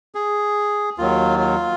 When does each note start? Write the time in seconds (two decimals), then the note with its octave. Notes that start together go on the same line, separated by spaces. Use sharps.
0.15 G#4
0.98 D#2 D#3 F#3 F4
1.39 F4